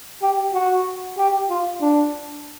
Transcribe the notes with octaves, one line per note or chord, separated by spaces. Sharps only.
G4
F#4
G4
F4
D4